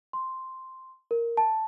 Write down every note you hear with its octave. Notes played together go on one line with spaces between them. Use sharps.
C6
A#4
A5